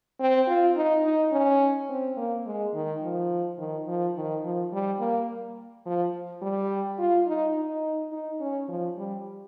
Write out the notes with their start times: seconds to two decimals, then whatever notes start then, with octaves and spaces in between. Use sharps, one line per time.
0.20 C4
0.47 F4
0.76 D#4
1.04 D#4
1.32 C#4
1.89 C4
2.17 A#3
2.46 G#3
2.74 D#3
3.03 F3
3.58 D#3
3.88 F3
4.16 D#3
4.44 F3
4.72 G3
5.00 A#3
5.86 F3
6.42 G3
6.99 F4
7.27 D#4
7.55 D#4
8.12 D#4
8.40 C#4
8.68 F3
8.97 G3